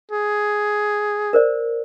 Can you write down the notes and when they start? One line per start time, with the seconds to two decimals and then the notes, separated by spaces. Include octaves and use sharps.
0.11 G#4
1.33 A#4 C5 D5